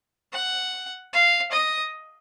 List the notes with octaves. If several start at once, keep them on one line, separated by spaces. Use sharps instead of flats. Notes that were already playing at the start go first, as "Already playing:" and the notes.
F#5
F5
D#5